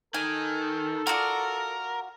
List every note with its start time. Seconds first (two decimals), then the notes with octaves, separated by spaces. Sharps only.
0.14 D#3 A4 G#5
1.07 F4 F#4 A#4 D5